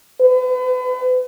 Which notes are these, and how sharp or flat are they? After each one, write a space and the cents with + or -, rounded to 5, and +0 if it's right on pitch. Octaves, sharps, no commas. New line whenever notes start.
B4 +40